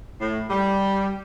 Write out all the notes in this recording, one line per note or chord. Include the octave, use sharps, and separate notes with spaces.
A2
G3